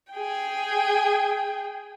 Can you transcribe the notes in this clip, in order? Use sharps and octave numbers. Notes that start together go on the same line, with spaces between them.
G#4 G5